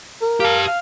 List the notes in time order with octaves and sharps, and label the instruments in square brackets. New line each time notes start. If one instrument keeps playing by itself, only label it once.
[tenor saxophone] A#4
[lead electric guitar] G4 A5 [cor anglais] F5
[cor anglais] F5